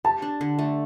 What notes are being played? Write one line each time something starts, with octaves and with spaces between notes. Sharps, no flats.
G4 A5
D4
D3
A3